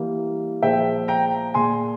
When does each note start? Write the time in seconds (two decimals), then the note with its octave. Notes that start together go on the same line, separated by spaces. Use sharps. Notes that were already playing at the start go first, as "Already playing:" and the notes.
Already playing: E3 G3 A#3
0.62 A#2 F3 G#3 E5 G5
1.08 G5 A#5
1.54 A#2 G#3 G#5 C6